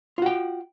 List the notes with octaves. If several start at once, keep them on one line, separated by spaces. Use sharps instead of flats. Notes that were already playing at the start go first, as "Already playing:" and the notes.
F4 F#4 G5